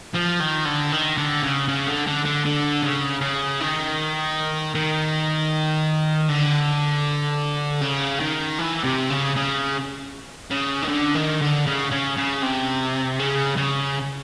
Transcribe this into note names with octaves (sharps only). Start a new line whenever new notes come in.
F3
D#3
D3
D#3
D3
C#3
C#3
D3
D3
D3
D3
C#3
C#3
D#3
D#3
D3
C#3
D#3
E3
C3
C#3
C#3
C#3
D#3
D3
D#3
D3
C#3
C#3
C#3
C3
C#3
C#3